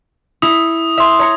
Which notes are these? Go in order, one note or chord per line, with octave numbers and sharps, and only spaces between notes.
E4 D#6
E5 C6
C#5 A#5 C#7